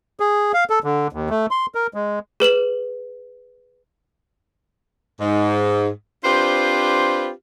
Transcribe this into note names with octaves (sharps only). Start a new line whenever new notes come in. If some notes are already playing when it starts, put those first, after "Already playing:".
G#4
F5
A4
D3
D#2
A3
C6
A#4
G#3
G#4 B4 E7 F#7
G#2
C4 D4 F4 G4 B4 C5